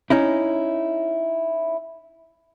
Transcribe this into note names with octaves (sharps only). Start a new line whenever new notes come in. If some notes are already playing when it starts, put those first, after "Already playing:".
C#4 D#4 E4